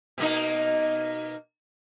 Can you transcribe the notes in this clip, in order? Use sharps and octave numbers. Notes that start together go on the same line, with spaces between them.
B2 A#3 D#4